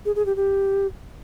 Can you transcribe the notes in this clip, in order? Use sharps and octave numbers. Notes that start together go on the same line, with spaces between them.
G#4
G#4
G4
G4